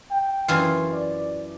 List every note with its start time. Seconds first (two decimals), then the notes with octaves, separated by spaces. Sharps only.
0.11 G5
0.48 F#2 E3 F4
0.93 D5